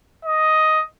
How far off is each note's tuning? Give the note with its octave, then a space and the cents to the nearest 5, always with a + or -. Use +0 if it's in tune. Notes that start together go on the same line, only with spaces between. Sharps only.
D#5 +5